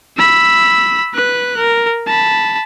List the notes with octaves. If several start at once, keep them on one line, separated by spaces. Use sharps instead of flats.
B5 E6
B4 F#6
A#4
A5 B5